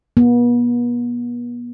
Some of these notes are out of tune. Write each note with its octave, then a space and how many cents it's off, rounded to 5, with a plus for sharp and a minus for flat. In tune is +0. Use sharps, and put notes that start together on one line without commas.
B3 -40